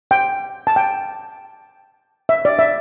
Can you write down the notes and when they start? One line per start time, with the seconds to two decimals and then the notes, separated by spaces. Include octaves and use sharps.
0.11 G5
0.67 A5
0.76 G5
2.29 E5
2.45 D5
2.59 E5